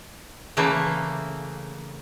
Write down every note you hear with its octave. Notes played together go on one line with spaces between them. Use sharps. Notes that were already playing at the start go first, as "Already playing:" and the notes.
C#3 E3 A3 A#3